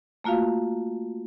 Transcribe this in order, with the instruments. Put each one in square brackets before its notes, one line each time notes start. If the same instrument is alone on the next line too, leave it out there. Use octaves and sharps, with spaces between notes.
[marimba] A3 A#3 F4 F#4 F5